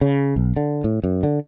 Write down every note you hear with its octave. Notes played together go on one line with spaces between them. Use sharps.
C#3
B1
D3
A2
F#2
D3